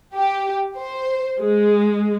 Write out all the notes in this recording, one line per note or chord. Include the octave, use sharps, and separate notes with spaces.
G4
C5
G#3